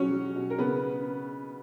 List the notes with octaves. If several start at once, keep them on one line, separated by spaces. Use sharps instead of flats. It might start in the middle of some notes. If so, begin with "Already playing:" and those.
Already playing: B2 F#3 C#4 C#5
F#3
B2
A#4
C#3 B3 B4